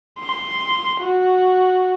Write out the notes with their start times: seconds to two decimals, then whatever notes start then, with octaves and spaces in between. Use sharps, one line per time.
0.20 C6
1.01 F#4